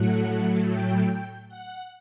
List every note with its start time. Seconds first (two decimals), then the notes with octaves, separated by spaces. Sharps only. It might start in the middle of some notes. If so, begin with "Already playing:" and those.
Already playing: A2 F#3 A3 F#5
0.69 G5
1.48 F#5